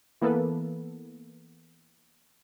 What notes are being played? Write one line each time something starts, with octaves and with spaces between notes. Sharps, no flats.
E3 A#3 B3 A4 B4